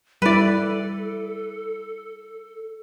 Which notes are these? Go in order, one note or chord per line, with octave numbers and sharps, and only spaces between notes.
G3 E4 A4 B4 D5